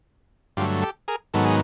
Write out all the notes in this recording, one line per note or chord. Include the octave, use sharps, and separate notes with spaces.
G2 D3 F#3 A3 F4 G4
G4 A4
G#4 A#4
G#2 D#3 F#3 B3 A4
G#4